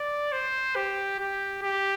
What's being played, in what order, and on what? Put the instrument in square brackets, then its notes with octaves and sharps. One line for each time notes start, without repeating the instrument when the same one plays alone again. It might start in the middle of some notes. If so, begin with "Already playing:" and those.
Already playing: [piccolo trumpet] D5
C5
G4
G4
G4